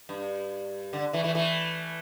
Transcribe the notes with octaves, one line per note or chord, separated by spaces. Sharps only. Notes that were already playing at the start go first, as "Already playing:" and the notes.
G2
D3
E3 A3
E3 A3
E3 A3